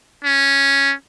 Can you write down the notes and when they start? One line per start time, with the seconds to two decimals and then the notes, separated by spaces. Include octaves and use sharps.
0.24 C#4